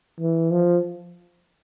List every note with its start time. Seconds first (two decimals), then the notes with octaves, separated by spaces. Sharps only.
0.21 E3
0.52 F3